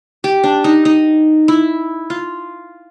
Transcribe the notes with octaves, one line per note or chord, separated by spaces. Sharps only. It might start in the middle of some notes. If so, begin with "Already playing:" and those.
G4
D4
D#4
D#4
E4
F4